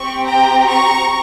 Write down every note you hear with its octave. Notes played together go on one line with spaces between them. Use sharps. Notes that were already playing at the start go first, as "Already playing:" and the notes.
Already playing: C4 G4 C#6
G5 A#5
A#5 C#6